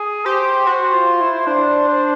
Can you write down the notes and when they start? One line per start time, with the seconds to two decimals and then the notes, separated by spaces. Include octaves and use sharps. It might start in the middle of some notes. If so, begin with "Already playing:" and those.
Already playing: G#4
0.26 G4 C5
0.66 F#4 C5
0.93 F4
1.21 E4
1.47 D4 C5
1.88 C5